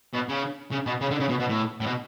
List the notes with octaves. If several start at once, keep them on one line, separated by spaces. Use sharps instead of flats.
B2
C#3
C#3
B2
C#3
D3
C#3
B2
B2
A2
A2
B2